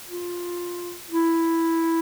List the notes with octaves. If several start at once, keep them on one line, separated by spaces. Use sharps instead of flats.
F4
E4